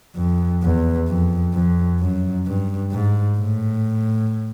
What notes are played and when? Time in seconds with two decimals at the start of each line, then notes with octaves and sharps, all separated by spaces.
0.16 F2
0.62 E2
1.08 F2
1.53 F2
2.00 F#2
2.46 G2
2.91 G#2
3.37 A2